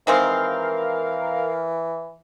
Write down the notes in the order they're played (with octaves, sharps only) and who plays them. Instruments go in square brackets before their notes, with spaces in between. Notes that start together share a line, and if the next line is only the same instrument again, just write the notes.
[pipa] D#3 G#3 C4 [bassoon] E3 [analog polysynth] A#4 F5